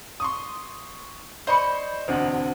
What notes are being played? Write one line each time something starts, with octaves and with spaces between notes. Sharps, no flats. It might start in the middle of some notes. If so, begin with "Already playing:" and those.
C6 C#6 D#6
C5 D5 D#5 B5 C#6 C#7
E1 D2 C4 D4 C5 F#5